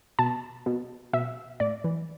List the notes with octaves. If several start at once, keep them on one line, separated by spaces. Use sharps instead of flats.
B2 A5
B2
B2 E5
A2 D5
E3